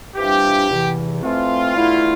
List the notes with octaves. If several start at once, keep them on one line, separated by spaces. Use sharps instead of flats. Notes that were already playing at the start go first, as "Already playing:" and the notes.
C3 E3 G3 D4 F4 G4
E2 C3 E3
F2 E3 A3 C4 F4
E2 D3 A3 E4